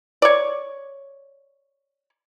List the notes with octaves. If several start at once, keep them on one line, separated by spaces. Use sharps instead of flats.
C#5 D5